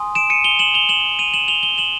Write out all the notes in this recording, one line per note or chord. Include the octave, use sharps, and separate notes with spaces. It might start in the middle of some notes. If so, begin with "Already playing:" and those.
Already playing: G#5 C6 D#6
D7 E7
C#7 D#7
F7 G7
E7 F#7
F7 G7
E7 F#7
D#7 F7
E7 F#7
F7 G7
F7 G7
E7 F#7